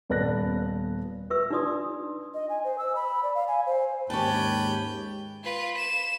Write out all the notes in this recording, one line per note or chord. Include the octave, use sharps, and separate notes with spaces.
D#1 B3 B4 D5 F#6 A#6
B4 E5 C#6 E6
D4 D#4 F4 D5 C6 D#6
D#5
G#5
C5
E6
B5
D5
F5
G#5
C5
D#2 G#2 C#4 G4 B4 G5 A5
F4 B4
E7